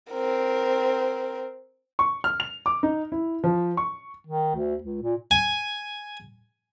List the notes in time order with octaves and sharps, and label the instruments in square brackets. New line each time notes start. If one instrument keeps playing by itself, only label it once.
[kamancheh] C4 A#4
[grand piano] C#6
F6
F7
D6
D#4
E4
F3
C#6
[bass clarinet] D#3
D2
C#2
A#2
[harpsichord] G#5